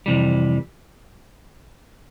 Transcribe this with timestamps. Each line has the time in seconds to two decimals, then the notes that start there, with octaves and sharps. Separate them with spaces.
0.06 F2 C3 E3 G3